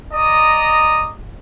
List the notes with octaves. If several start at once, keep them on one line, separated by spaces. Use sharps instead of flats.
D5 D#5 A#5 D#6